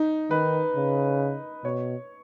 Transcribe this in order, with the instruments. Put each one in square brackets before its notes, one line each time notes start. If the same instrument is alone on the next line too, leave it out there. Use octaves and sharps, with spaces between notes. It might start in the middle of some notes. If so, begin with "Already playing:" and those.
Already playing: [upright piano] D#4
[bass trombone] D#3 [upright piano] B4
[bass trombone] C#3
[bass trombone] B2 [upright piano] C#5